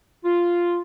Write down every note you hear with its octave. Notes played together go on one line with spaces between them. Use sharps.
F4